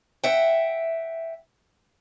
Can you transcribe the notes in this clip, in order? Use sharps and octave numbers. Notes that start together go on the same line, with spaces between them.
E5 F#5 G5